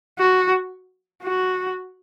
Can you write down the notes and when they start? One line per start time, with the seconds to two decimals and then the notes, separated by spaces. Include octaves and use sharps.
0.19 F#4
1.23 F#4